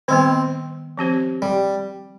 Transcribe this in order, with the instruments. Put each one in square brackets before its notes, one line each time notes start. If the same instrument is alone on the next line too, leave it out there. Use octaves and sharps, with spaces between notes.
[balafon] D#3 G3 B3 [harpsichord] C4
[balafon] F3 C4 G4 C5
[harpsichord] G3